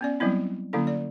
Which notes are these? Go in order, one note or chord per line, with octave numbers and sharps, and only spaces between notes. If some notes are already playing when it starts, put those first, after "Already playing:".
B3 C#4 D5
F#3 G3 B3 C4 E4
D3 F#3 A#3 C#4 E4 A4
D5